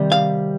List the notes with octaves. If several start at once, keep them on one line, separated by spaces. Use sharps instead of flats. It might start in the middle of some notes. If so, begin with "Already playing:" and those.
Already playing: C3 D#3 G3
F5